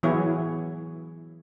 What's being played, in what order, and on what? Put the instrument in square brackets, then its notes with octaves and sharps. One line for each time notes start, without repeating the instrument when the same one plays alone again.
[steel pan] E3 F#3 B3 E4 G#4 C#5